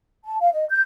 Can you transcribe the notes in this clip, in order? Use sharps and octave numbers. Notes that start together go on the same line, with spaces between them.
A5
F5
D#5
G6